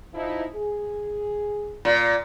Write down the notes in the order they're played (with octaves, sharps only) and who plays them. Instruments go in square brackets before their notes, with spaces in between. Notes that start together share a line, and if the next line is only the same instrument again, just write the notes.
[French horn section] F3 D#4 E4
G#4
[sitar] A#2